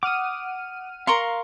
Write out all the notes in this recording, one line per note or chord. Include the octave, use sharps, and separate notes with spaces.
F#5 D6 D#6 F6 D#7
A#4 F5 A#5 C6 C#6